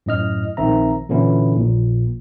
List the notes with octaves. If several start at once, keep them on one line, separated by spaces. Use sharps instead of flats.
F#2 A2 D#5 F6
A#1 D#3 C4 E5 A#5
A#2 D3 E3 C#4 E4
A#1 A#2